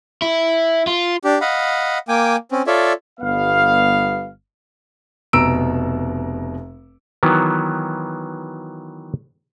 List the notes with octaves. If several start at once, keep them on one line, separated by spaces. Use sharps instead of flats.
E4
F4
D4 G4
D#5 F5 F#5 B5
A#3 G5 G#5 D6
C4 C#4
F4 A4 C#5 D5 E5
G1 G3 B3 F5
F1 B2 A#5 E6 D7
D#3 E3 F#3 B3